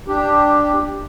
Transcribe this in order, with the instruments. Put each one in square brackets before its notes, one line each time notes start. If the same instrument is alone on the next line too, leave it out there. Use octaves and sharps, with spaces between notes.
[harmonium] D4 G4